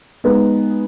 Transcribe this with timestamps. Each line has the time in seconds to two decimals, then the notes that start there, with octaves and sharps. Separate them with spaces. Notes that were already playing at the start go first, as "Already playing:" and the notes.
0.24 G#3 B3 D#4